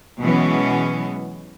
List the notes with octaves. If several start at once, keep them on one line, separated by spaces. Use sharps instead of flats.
B2 E3 F#3 G#3 B3 C#4